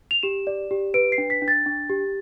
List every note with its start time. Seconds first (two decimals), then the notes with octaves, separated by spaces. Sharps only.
0.11 F7
0.23 G4 E7
0.47 D5
0.71 G4
0.94 B4 D7
1.12 C7
1.18 D4
1.30 B6
1.42 D4
1.48 A6
1.66 D4
1.89 G4